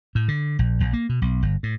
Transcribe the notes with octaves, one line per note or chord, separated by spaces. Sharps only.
A2
D3
A#1
A#1
A#3
B2
B1
G1
A2